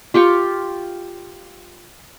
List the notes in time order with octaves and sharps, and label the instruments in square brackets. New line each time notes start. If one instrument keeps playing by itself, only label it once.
[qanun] F4 G4 G5 C#6